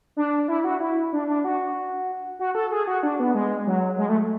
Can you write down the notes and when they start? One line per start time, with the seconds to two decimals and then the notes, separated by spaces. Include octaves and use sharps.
0.17 D4
0.48 E4
0.64 F#4
0.80 E4
1.13 D4
1.28 D4
1.44 F#4
2.39 F#4
2.55 A4
2.72 G#4
2.87 F#4
3.03 D4
3.20 B3
3.35 G#3
3.67 F#3
3.98 G#3
4.09 A3